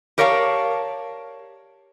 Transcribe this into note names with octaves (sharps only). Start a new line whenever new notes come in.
G4 A#4 C#5 D5 F5 A5